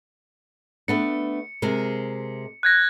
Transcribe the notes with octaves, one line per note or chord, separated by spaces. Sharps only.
A3 B3 D4 C#7
C3 G#3 A#4
F#6 G#6 A#6